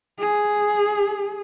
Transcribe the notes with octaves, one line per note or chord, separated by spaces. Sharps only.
G#4